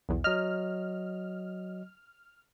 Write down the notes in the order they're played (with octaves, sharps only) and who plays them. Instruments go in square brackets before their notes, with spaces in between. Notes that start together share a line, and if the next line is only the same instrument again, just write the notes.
[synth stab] B1 E2
[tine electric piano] F#3 D#5 [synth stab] F6